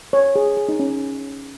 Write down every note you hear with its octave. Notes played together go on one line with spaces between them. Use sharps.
C#5
G#4
G#4
D#4
C#4